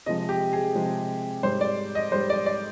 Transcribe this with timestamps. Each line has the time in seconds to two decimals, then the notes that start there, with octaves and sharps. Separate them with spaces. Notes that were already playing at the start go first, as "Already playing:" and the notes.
0.06 C3 F3 G#3 D#5
0.29 G4
0.53 G#4
0.75 C3 F3 G#3
1.43 G#2 G3 C5
1.61 D5
1.95 D#5
2.12 G#2 G3 C5
2.30 D5
2.46 D5